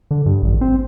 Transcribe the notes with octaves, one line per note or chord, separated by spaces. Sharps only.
D3
G2
A1
C4